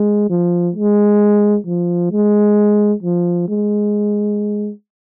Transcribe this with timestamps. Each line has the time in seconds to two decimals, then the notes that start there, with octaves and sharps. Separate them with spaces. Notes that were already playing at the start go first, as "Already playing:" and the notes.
Already playing: G#3
0.30 F3
0.76 G#3
1.67 F3
2.12 G#3
3.03 F3
3.48 G#3